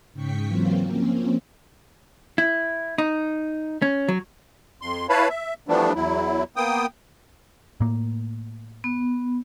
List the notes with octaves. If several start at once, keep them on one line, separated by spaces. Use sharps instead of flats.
G#2 C#3 G5 C#6 B6 C#7
E3 F#3 A#3 C4 F4
F3 A#3 C4 C#4
E4
D#4
C#4
F#3
F2 C6
E4 B4 C#5 F5 A5 B5
E5
E3 F3 G3 A3 B3 D4
E2 F#3 E4
A#3 B3 G5 D#6
A2 A#3
B3